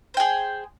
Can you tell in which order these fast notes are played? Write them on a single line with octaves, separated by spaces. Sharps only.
C5 G5 G#4